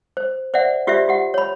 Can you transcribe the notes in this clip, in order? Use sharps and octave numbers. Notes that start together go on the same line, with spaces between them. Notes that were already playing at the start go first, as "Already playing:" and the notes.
C5
C5 D5 E5 F#5
F4 G4 C5 D5 E5
F4 G4 F#5
C#5 B5